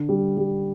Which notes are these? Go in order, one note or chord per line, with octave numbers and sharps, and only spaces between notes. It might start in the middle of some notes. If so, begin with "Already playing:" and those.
Already playing: D3
G3
G3